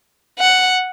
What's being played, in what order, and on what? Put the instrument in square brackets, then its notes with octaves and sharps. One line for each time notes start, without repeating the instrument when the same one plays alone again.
[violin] F#5